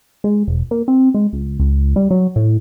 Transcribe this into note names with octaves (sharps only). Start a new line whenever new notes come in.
G#3
E1
A#3
C4
G#3
C#2
C#2
G3
F#3
A2